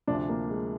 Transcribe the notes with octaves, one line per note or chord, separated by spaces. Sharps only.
D2 C3 F3 D4
A#3
G#3